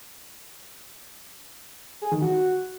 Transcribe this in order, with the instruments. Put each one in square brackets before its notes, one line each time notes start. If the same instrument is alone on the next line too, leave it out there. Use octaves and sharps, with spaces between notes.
[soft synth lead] G#4
D#3
F#4